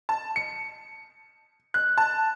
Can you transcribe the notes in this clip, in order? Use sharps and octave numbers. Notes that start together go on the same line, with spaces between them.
A5
C#7
F#6
A5